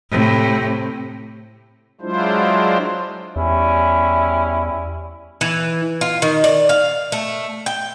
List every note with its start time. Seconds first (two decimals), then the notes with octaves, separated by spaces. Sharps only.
0.11 A2 C3
2.01 F#3 G#3 D4 E4 F4 C5
3.36 E2 G3 C#4 E4
5.41 E3
6.01 F4
6.22 D#3
6.44 D5
6.69 F5
7.12 A3
7.66 G5